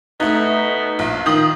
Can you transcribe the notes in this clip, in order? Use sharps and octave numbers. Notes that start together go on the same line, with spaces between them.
B2 A3 D#4
A#1
D#3 F4 D#6 F#7